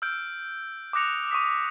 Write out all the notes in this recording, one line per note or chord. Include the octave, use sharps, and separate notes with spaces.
E6 F6 G6 D7
D6 D#6 F#6 A#6 C#7 F7
C#6 D#6 B6